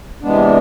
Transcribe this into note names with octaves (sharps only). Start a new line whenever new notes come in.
C3 E3 G#3 B3 D4